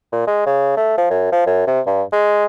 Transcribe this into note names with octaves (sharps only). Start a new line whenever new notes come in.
A#2
G#3
C#3
A3
F3
F#2
F3
F#2
C3
G2
G#3